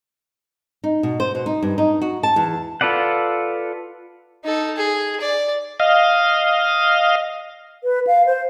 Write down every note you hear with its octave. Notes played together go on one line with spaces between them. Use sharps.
D#4
B2
C5
B2
D#4
G2
D#4
F#4
A5
E2
F4 A4 B4 D5 F#5
D#4 A4
G#4
D5
D#5 F5
B4
F5
C5